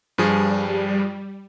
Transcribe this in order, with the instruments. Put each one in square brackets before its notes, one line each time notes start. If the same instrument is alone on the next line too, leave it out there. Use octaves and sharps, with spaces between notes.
[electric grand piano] G2 F3 G#4 [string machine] G3